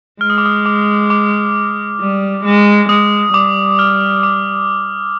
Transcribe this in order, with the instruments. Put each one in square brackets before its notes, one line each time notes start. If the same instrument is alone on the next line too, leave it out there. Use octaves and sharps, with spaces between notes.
[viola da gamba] G#3 [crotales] F6
[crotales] D#6
D6
D#6
D6
D6
[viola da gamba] G3
G#3
[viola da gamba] G#3 [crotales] D#6
[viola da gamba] G3 [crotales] D6
[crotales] F6
D6